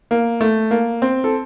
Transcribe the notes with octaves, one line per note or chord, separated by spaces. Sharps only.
A#3
A3
A#3
C4
A4